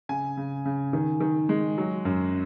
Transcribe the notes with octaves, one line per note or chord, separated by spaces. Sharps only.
C#3 G#5
C#3
C#3
D#3
D#3
G#3
F#3
F#2